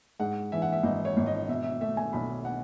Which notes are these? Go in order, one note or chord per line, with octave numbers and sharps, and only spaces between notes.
G#2 F#5
E3 E5
F#5
E5
G#1 D#5
C#5
G#1
D#5
B2 E5
E5
A3 E5
G#5
B1 B5
F#5